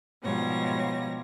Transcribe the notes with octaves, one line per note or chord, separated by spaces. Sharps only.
G#2 B2 F3 G3 C#5 A#6